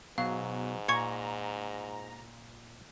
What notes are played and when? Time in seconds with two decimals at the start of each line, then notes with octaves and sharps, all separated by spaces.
0.18 G#2 B2 F#3 F5
0.88 A#2 A#5 C#6 G#6 C#7